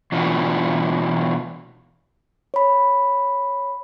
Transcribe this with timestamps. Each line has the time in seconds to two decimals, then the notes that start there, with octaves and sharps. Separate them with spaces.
0.12 B2 E3 D4 F4 F#4
2.54 C#5 B5